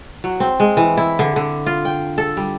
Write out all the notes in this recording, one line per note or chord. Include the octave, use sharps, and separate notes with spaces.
F#3
C4
G#3
E3
E4
D3
D3
F4
G5
A4
G3